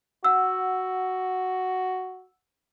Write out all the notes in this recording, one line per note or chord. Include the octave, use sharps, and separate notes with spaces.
F#4 F#5 E6